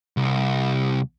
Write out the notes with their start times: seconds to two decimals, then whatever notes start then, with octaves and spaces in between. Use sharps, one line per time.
0.17 C2